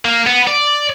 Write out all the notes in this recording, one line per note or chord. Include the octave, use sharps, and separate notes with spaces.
A#3
B3
D5